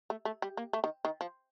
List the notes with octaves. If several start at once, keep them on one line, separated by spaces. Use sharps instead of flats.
A3
A3
G3
A#3
A3
D#3
D#3
F3